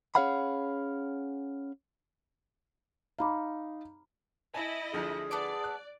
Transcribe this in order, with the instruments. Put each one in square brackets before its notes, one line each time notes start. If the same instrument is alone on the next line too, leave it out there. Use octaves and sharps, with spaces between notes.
[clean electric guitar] C#4 G#4 C#5 F5 F#5 B5
[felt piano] D#4 F5 [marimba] A#5 B5 D6
[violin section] E4 D#5 A#6 [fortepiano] G#5 A5
[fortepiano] D2 D3 F3 [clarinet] G#4
[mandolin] B3 A4 D6 [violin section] D5
[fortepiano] F#6